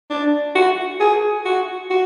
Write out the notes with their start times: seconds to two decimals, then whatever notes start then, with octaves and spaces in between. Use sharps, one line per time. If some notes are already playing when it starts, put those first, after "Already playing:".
0.10 D4
0.55 F#4
1.00 G#4
1.45 F#4
1.90 F#4